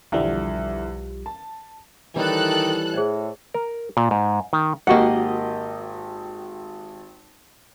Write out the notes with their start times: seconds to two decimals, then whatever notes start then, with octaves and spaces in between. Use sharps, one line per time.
0.12 B1 E2 D3 F3 G3
1.26 A5
2.16 D#3 E3 G3 C#4 A4 F#6
2.93 A2 G#4 C5 D5
3.54 A#4
3.97 A#2
4.11 G#2
4.53 D#3
4.87 G#1 A#3 F#4 G4 D#5 F#5